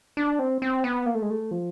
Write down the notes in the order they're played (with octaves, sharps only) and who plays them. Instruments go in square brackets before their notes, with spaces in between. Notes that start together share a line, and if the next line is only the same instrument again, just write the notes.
[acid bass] D4
C4
C4
B3
A#3
A3
G#3
A3
F3